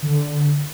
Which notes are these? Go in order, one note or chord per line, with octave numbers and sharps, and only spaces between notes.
D3